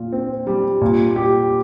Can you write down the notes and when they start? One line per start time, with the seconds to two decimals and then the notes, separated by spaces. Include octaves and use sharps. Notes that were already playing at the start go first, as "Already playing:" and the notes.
Already playing: A#2 F4
0.12 C4
0.47 G3
0.81 A#2
1.16 G4